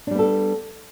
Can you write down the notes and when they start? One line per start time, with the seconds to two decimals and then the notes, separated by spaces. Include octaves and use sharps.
0.07 D4
0.11 G3
0.15 B3
0.19 A4